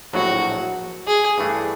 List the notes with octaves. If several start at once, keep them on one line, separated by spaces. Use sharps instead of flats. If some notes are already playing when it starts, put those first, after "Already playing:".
A#1 A2 F#3 F#4
G#4
G2 E3 A3 D4